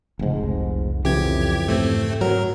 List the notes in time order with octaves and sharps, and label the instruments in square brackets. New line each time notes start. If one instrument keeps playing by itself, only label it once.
[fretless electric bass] F1 G#2 [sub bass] C#3
[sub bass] C2
[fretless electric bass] F2 C#3 E3 [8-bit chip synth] G4 G#6
[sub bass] G#2 [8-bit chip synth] A3 C4
[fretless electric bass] F#3 [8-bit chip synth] A#4